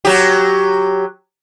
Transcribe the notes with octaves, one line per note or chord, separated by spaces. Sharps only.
F#3 G4